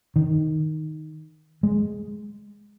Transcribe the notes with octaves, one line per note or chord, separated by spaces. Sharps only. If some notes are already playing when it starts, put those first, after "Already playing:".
D#3
G#3